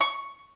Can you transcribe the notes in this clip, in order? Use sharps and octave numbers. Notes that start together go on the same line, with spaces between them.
C#6